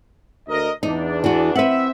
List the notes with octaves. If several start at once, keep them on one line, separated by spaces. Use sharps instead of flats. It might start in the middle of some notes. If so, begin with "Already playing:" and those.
D2 A#4 D#5
E2 D4 D#4
E3 F#4
C4 B4 E5 F#5